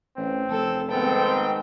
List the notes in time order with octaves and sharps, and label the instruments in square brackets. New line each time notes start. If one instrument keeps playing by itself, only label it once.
[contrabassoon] A1 [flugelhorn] C4
[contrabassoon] F1 [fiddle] A4
[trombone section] G#2 D#3 C4 [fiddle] B3 G5 [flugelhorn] A4